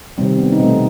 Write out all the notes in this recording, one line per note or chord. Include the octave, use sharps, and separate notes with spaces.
C3 D#3 G3 C4
B3
D#4
B2 A3 C4